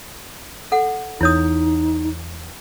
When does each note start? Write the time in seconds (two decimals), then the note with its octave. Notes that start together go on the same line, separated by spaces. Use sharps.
0.72 A4 F#5
1.21 E2 D#4 E4 C#5 D#6